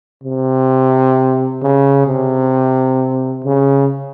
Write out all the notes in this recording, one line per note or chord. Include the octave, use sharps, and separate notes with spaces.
C3
C#3
C3
C#3